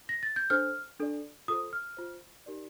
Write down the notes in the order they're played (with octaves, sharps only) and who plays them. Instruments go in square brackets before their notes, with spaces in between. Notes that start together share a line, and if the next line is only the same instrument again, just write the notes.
[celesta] A#6
A6
G6
D4 A4 C5 F6
D4 A4 D5
F4 A4 C5 D#6
F6
F4 C5
D#4 G4 A#4 D5